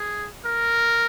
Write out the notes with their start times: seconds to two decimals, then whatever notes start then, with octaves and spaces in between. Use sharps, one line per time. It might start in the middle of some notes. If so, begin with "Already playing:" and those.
Already playing: G#4
0.45 A#4